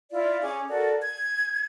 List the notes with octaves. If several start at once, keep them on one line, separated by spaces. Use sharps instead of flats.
E4 F4 D5
C#4 G#4 D6
F#4 A4 A#4 D5
G#6